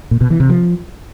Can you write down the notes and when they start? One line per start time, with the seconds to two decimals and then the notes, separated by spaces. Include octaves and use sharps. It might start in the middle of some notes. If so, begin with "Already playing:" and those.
0.11 A#2
0.21 B2
0.30 E3
0.40 C3
0.49 F3